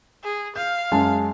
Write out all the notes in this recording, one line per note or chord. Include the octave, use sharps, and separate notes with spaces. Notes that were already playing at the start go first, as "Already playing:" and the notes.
G#4
F5 G6
F#2 G#3 A5